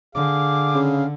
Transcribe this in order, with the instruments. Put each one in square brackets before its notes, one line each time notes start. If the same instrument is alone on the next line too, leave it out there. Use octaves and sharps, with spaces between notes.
[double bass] D3 [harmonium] G#4 F5 [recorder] D6
[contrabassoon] C#3